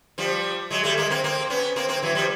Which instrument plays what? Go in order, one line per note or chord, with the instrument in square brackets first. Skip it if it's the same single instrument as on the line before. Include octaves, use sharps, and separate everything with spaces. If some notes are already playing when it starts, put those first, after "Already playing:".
[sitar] F3 G3
F#3 G#3
G3 A3
G#3 A#3
A#3 C4
A#3 C4
B3 C#4
A#3 C4
A#3 C4
E3 F#3
F3 G3